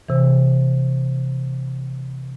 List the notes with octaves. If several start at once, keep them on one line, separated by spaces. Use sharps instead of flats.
C3 E3